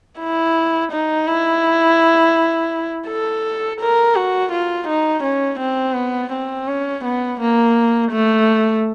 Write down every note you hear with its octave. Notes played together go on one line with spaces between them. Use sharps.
E4
D#4
E4
A4
A#4
F#4
F4
D#4
C#4
C4
B3
C4
C#4
B3
A#3
A3